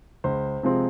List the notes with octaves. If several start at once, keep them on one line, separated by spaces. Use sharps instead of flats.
C#2 C5
C3 F3 G#3 C4